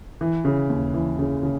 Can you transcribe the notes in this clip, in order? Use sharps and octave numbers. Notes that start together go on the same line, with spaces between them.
E3
C#3
D#2
E3
C#3
C#3